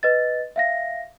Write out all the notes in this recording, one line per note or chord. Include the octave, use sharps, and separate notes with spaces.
B4 D#5 A6
E5 F5 A#6